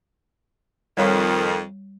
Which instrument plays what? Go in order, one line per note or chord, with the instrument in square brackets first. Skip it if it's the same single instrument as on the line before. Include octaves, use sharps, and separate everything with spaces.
[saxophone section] F2 D#3 [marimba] G3 C#5 F5